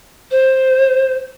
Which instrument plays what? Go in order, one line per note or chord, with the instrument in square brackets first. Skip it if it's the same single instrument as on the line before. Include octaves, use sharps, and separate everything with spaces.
[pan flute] C5